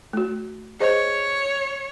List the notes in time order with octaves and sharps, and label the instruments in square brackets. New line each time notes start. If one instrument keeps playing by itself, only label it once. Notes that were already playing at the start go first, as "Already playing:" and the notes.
[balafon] A3 F#4
[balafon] G#4 C5 D#5 [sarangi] C#5